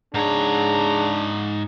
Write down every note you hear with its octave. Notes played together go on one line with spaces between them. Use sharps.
G#2 D4 G#4 C#5 A#5